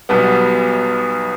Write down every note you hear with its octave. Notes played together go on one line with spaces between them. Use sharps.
B1 B2 G3 B3